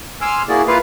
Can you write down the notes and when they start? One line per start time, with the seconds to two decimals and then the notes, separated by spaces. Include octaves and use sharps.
0.21 G#5 C6 D6 E6 F6
0.49 A#3 E4 F#4 G#4 D5
0.67 A#3 E4 F4 B4 F5